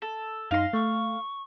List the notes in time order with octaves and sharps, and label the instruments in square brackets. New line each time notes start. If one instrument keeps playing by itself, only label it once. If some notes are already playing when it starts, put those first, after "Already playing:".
[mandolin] A4
[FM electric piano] F#2 D#4 A#6 [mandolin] F5 C6
[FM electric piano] A3 [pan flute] C#6